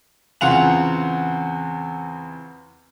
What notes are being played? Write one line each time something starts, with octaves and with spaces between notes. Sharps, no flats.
E2 C#3 C4 F4 F#5 F7